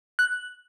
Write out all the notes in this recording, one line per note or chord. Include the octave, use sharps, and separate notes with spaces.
F#6